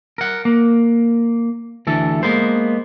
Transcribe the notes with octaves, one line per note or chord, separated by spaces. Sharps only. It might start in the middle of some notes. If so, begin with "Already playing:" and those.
A#4 F#5
A#3
D2 E3 A4
G#3 A#3 B3 C5